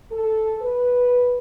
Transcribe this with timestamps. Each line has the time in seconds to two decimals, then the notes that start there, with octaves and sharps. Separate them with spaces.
0.12 A4
0.61 B4